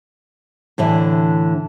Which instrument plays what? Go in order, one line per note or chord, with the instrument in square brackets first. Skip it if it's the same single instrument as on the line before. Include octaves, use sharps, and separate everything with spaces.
[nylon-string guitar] A2 D3 E3 D4